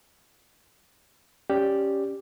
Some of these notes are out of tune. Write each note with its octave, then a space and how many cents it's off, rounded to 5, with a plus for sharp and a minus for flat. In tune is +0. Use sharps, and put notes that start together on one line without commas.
C#4 +0 G4 +0 D5 +0